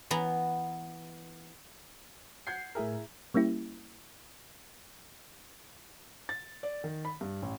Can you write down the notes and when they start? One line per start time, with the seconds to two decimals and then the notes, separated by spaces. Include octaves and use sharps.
0.11 E3 B3 A#5
2.47 F#5 G6 G#6 C7
2.75 A2 E4 G#4 A#4 E5
3.34 G3 A#3 C#4 E4 G4
6.29 A6
6.63 D5
6.84 D#3
7.05 B5
7.21 G2
7.42 A1